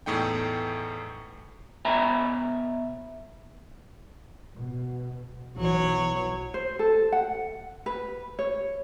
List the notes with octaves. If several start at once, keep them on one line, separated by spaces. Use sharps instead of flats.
E2 A2 A3 D#4 G5
B2 E5 G#5 A#5 B5
B2
B1 E3 F#3 C#5
C5
A4
F#5
B4
C#5